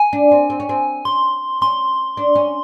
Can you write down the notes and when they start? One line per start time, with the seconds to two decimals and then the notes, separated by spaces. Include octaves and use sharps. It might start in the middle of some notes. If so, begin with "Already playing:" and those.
Already playing: G#5
0.13 D4
0.31 C4
0.50 C4
0.60 C#4
0.69 C4
1.05 C#4 C6
1.62 C#4 C6
2.17 D4
2.35 C#4